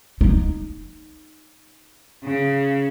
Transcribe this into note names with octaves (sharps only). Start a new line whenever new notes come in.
D#4
C#3